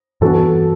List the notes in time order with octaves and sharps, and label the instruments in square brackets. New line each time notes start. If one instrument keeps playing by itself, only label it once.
[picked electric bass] G2 E3 B3 D4 [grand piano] F#4 A4